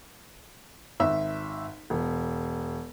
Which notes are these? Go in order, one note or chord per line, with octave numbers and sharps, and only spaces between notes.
G#1 E5
E1